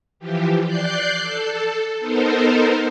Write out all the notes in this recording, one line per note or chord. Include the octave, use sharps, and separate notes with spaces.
E3 F3 G4
D5 F#6 G6 C7
A4
B3 D#4 A4 A#4 C5